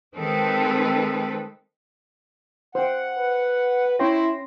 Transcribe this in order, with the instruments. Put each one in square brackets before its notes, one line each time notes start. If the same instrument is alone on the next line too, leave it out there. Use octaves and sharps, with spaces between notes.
[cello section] D#3 G#3 C4 A4 B4
[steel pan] C5 G5 [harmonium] F#5
[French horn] B4
[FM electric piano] C#4 C6 A#6 [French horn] E4 [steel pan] C#5 G5 C#6